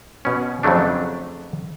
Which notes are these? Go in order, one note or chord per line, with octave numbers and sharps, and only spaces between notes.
B2 C#4
F2 C#3 F#3 A3 D4